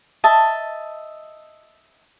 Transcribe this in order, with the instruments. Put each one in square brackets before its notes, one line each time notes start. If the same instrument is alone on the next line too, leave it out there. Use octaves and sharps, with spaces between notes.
[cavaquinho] D#5 E5 A5